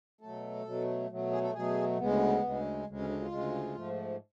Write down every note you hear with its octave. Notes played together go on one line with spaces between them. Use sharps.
B2 F#3 A3 A4
B2 F#3 A3
B2 F#3 A3
G#4
A4
B2 F#3 A3 G#4
D2 C#3 G#3 B3
D2 C#3 G#3
D2 C#3 G#3
C#4
D4
F4
D2 C#3 G#3
G#2 F3 A3